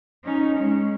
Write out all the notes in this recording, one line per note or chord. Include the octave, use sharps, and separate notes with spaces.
C#4 D#4
G#3 C#4